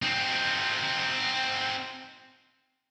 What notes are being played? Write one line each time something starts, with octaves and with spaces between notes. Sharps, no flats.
C4 D#4